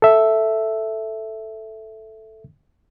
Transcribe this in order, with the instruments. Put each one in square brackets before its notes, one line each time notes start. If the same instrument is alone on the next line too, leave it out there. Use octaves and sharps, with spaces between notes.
[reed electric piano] A4 E5